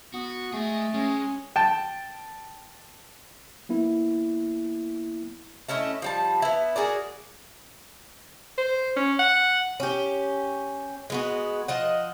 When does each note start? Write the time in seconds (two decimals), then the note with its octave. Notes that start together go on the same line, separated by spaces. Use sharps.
0.14 B3 F#4
0.53 G#3 A3 G#4
0.94 G#3 C#4
1.56 G5 A5
3.69 A#3 B3 E4
5.69 A3 C#4 E4 D#5
6.02 F3 G3 A5
6.42 B3 E4
6.76 F#4 G#4 A#4 D5
8.58 C5
8.96 C#4
9.19 F#5
9.80 C#4 G4
11.10 G#3 B3 F#4
11.68 F3 D#5 F#5